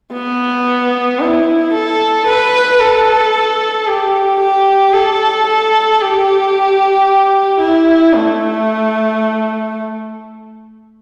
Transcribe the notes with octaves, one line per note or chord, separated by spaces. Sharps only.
B3
E4
A4
B4
A4
G4
G4
A4
A4
G4
E4
A3